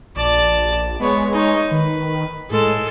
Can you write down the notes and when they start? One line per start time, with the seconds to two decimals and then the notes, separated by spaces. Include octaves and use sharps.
0.16 A#1 D5 A5
1.00 G#3 B3 C#5
1.33 D#4 C#5
1.71 D#3 B4
2.51 A2 G#3 A4